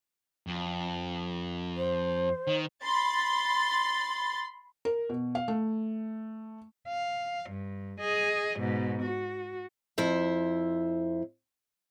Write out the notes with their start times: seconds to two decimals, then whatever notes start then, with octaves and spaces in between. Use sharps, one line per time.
0.47 F2
1.76 C5
2.47 D#3
2.84 B5 C6 A6
4.85 A#4
5.10 B2
5.35 F5
5.48 A3
6.88 F5
7.50 G2
8.00 G#4 D#5
8.60 G#2 B2
9.02 F#4
9.98 F2 E4 C5 E5